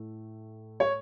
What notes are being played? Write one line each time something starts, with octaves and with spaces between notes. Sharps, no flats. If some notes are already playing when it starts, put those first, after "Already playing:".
Already playing: A2 A3
C#5